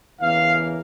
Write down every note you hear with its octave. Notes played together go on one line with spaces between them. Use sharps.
E2 C#3 E3 A#3 F5